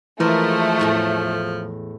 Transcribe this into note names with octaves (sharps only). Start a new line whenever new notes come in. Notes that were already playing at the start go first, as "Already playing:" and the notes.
E3 F3 G#3 A3 A#4
E2 A2 A5